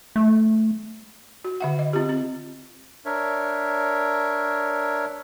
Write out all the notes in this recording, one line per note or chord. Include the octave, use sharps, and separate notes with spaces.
A3
F#4
D3 E5 F#5
D#5
C4 F4 G4
C4
D4 A#4 C#5 E5